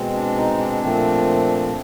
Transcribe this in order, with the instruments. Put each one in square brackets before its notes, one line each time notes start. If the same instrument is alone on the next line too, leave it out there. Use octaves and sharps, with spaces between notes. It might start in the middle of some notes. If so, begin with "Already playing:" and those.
Already playing: [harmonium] B2 G#3 C4
D4
D#4
D4
A#2 F3 A3 C4